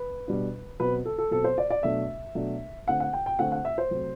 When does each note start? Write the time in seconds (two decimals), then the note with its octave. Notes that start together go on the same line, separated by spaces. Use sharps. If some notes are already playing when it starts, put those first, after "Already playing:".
Already playing: B4
0.28 B2 G3 D4
0.80 B2 F#3 C4 B4
1.05 A4
1.18 A4
1.31 B2 F#3 C4 A4
1.44 C5
1.58 D5
1.70 D5
1.83 B2 F#3 A3 D4 E5
2.35 B2 F#3 A3 D4
2.87 D3 A3 C4 F#5
3.00 F#5
3.13 G5
3.26 G5
3.39 D3 A3 C4 F#5
3.52 F#5
3.65 E5
3.78 C5
3.91 C3 F#3 A3 C4